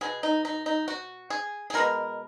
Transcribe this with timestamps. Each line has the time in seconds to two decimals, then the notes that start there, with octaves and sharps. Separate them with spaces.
0.01 B2 F#3 B3 G#4
0.23 D#4
0.45 D#4
0.66 D#4
0.88 F#4
1.30 G#4
1.70 G#4
1.74 B2 G#3 B3 A#4